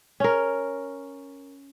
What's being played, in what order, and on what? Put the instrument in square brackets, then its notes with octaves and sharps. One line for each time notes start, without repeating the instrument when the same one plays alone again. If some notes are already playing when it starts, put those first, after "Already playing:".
[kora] C#4 A#4